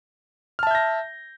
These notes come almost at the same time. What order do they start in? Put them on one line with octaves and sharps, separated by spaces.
F6 A5 E5 G6 A#6